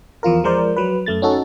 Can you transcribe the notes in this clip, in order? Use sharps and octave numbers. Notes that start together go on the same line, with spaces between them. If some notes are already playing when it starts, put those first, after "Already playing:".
E2 F3 F4 A#4
F3 G#3 A#4 C5 D5
F#3 B4
F#2 A3 A6
C#4 D#4 F#4 A4